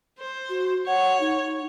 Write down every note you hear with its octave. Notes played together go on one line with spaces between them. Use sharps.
C5
F#4
C#5 F#5
D#4